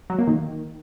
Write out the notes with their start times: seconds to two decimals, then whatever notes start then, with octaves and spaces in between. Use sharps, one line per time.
0.10 F#3
0.19 A#3
0.27 D#3